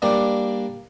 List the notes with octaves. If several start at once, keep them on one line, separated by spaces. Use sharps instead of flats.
G3 A#3 D4 D5